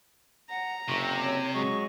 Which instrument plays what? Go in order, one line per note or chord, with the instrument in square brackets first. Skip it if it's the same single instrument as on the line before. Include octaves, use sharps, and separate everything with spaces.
[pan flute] F#5 [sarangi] A#5
[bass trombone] F#1 [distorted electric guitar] C3 [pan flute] C#6
[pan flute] C#5
[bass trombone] F#3 [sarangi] G#3 [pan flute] C#6